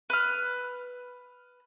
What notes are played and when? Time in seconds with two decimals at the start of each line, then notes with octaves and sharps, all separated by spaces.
0.10 B4 F6